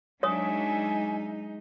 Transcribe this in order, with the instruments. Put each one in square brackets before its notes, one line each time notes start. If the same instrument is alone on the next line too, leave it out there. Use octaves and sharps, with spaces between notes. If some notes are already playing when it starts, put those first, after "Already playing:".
[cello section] F#3 D4 E5 [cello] G#3 D#4 [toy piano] C#5 D#6 [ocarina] G#5